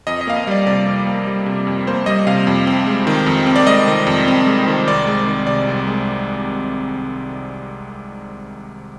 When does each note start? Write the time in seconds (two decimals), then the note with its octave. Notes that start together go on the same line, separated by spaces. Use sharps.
0.07 F2 D#5
0.21 D#5
0.27 A#3 F5
0.36 D#5
0.47 G3 D5
0.66 C3 D5
0.86 F2
1.07 A#3
1.27 G3
1.46 C3
1.67 F2
1.87 A#3 C5
2.06 G3 D#5
2.27 C3 F5
2.47 F2
2.67 C4
2.87 G#3
3.07 D#3
3.26 F2
3.47 C4
3.56 D5
3.67 G#3 D#5
3.88 D#3
4.07 F2
4.28 C4
4.47 G#3
4.68 D#3
4.87 C2 D5
5.07 G#3
5.27 D#3
5.47 C3 D5
5.67 C2
5.87 G#3